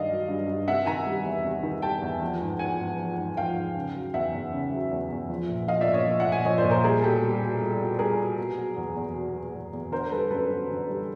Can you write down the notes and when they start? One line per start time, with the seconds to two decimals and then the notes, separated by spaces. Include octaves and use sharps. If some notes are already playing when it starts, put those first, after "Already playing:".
Already playing: G2 D#3 D5 D#5 F5
0.10 F#3
0.29 G2
0.48 G2
0.68 C3 E5 F#5
0.86 D#3 G#5 A#5
1.06 G3
1.25 E2
1.44 C3
1.63 D#3
1.82 G3 G5 A5
2.02 E2
2.22 F3
2.41 G#2
2.59 F3 F#5 G#5
2.80 G#2
2.98 F3
3.17 G#2
3.37 F3 F5 G5
3.56 G#2
3.75 C#3
3.95 F#3
4.14 E2 E5 F#5
4.34 E2
4.53 C#3
4.72 F#3
4.91 E2
5.11 E2
5.30 F3
5.48 A#2
5.68 F3 D#5 F5
5.81 D5 E5
5.87 A#2
5.94 C#5 D#5
6.07 F3
6.20 E5 F#5
6.26 A#2
6.32 F#5 G#5
6.45 F3 C#5 D#5
6.58 C5 D5
6.64 A#2
6.71 A#4 C5
6.83 G3 G#4 A#4
7.03 B2 G4 A4
7.22 G3
7.41 B2
7.61 G3
7.81 B2
7.99 G3 G#4 A#4
8.19 B2
8.38 B2
8.57 F#3
8.76 E2
8.96 E2
9.14 B2
9.34 F#3
9.54 E2
9.73 E2
9.92 D3 A#4 C5
10.12 G3 A4 B4
10.31 F#2 A4 B4
10.51 F#2
10.69 D3
10.88 G3